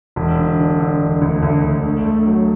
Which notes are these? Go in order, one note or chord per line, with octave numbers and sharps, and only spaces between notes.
E1
D3
D3
D3
E1
D2
D2
D2
A3
A3
F#3